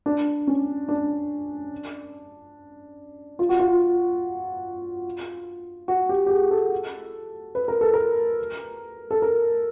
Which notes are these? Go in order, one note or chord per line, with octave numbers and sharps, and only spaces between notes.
D4
C#4
D4
F4
F#4
F4
F#4
G4
G4
G#4
A4
B4
A#4
A4
A#4
A4
A#4